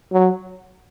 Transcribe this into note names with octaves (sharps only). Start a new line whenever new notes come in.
F#3